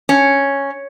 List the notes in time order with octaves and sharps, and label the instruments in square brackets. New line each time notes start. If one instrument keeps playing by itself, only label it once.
[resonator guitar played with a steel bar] C#4